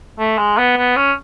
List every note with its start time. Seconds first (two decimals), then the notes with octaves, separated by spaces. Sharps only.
0.19 A3
0.38 G#3
0.58 B3
0.78 B3
0.96 C#4